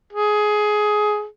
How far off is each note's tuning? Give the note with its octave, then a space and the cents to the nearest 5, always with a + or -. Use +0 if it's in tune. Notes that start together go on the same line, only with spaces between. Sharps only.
G#4 +15